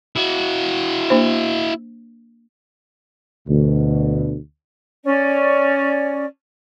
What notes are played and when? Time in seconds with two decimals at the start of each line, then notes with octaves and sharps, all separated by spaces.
0.16 E4 F#4
1.10 A#3 D4 C5
3.48 D2 B2
5.04 C#4 D5